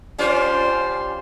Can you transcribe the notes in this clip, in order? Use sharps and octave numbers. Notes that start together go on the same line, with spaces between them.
G3 C#4 F4 C5